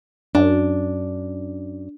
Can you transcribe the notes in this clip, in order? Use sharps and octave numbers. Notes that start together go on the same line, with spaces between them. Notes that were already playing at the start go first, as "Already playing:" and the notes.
F#2 D4